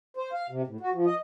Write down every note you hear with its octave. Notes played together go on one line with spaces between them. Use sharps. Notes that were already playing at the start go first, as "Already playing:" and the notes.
C5
F5
C3
A2
F#4
F3
D#5